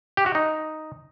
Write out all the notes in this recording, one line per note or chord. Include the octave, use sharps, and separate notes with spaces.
G4
F#4
D#4